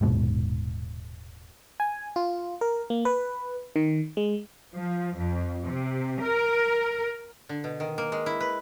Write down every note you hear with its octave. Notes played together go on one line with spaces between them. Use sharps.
D#1 G#2 B2
G#5
F4
A#4
A#3
B4
D#3
G#3
F3
F2
C3
A#4
D3
B2
D#3
A#3
G#3
E4
B4